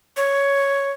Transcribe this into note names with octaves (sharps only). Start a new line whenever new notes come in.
C#5